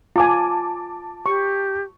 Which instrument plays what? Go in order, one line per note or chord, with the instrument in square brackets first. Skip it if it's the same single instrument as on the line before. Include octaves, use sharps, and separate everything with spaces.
[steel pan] F4 G#5 [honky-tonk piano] A5 D6
[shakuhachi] G4 [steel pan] C#6